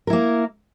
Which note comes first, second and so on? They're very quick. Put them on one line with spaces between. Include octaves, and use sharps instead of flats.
A#4 E4 A#3